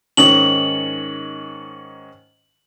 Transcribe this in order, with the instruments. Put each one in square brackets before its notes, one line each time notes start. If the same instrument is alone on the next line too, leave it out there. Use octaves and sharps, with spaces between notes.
[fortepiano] G#2 D#3 C#4 [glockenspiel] F#7